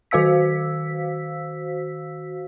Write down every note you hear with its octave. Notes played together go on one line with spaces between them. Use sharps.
D#3 F#4 C5 F5 E6 B6